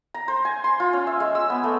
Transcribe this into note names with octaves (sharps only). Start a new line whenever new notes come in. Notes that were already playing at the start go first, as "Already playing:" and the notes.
A#5
C5
G#5
C6
F4
C#4
E5
G#3
E6
B3
A3